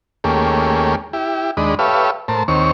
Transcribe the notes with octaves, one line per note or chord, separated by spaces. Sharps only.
D#2 A3 A#3 C#4 G4 G#4
E4 G4
D#2 G#3 D4 D#5 B5
G4 A4 B4 C#5 E5 F5
A2 A#4 C5 A5
D#2 D#3 C4 C#5 C#6